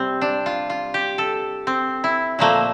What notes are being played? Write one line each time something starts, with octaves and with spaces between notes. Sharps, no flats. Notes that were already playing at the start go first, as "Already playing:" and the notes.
Already playing: C3 G3 C4
D4
F4
F4
G4
A4
C4
E4
A#2 F3 A3 A#3